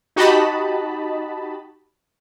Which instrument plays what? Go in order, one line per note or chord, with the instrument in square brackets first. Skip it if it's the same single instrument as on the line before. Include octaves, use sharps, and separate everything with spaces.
[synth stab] D#4 F#4 G4 D#5 A5 B5